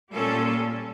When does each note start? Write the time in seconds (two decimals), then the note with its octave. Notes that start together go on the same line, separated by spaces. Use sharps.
0.13 A#2 G3 C#4 F4 A4